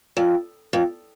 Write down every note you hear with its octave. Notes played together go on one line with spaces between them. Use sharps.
F2
F2